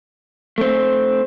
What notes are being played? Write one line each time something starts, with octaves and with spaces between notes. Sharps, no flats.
A3 C4